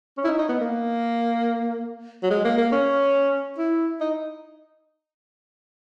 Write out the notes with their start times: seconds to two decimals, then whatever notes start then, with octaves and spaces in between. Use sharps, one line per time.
0.18 C#4
0.24 E4
0.28 D#4
0.39 D#4
0.49 B3
0.61 A#3
2.23 F#3
2.31 G#3
2.45 A#3
2.58 A#3
2.72 C#4
3.58 E4
4.01 D#4